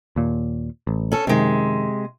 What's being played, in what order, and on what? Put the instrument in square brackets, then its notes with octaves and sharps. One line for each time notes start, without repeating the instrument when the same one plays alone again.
[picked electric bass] D#2 A#2
A1
[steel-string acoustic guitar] C#4 A4
[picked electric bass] F#2 D#3 [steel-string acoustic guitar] C3 G#3